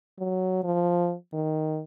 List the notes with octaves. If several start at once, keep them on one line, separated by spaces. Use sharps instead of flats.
F#3
F3
D#3